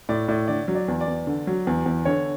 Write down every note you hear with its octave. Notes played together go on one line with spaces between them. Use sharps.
A2 D5
A2 D5
D3 D5
F#3
D5
E2
D5
E2
D3
F#3
E2
E2
D3 C#5